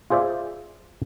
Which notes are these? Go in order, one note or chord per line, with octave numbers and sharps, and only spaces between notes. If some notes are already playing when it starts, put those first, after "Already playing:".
F4 G#4 C5 D5 E5